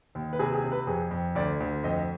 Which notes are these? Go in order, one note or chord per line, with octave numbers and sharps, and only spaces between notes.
D#2
B4
C3 G#4
G#4
C3
B4
F2 G#4
F2
D2 D5
D2
F2 D#5